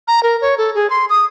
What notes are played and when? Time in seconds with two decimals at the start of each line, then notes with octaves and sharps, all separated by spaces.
0.08 A#5
0.23 A#4
0.41 C#5
0.58 A4
0.75 G#4
0.90 C6
1.10 D#6